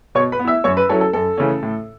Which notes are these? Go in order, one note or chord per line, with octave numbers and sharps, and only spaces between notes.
B2 C#5 C#6
B4 B5
B3
E4 E5 E6
F#2 C#5 C#6
B4
F#3 C#4 E4 A4
A4
F#2 A4
C#3 E3 A3 C#4
A2